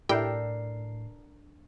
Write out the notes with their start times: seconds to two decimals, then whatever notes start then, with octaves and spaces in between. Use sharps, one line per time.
0.09 A2 D4 E4 G4 A4 A#4 G5 C7